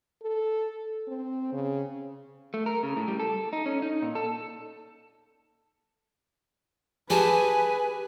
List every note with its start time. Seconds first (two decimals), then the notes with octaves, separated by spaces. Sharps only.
0.22 A4
1.08 C4
1.53 C#3
2.54 A3
2.66 A#4
2.83 C#3
2.96 A2
3.08 G3
3.20 A4
3.53 D#4
3.66 C#4
3.82 D#4
4.02 A#2
4.15 A4
7.10 G4 G#4 B4 G#5 A5